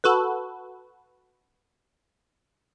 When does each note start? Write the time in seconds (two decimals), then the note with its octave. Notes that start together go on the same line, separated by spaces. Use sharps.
0.04 F#4 A4 B4